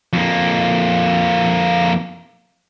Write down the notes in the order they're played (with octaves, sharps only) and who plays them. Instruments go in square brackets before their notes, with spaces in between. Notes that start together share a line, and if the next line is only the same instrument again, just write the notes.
[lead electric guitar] F2 A#3